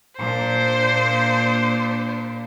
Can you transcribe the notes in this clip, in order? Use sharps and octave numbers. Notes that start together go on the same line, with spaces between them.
A#2 D4 C5